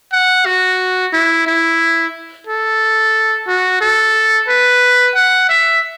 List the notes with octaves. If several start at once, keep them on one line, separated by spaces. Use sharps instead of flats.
F#5
F#4
E4
E4
A4
F#4
A4
B4
F#5
E5